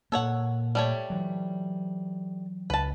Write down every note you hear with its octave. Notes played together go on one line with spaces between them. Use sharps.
A#2 A#3 A4 C#5 F#5
G3 A3 C#5
E3 F#3
C#2 B4 A5